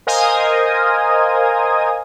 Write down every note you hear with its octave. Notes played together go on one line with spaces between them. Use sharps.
A#4 C5 D#5 F5 G#5 D#6